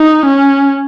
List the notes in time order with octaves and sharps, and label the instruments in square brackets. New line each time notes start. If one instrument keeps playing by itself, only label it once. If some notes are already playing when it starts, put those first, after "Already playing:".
Already playing: [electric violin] D#4
C#4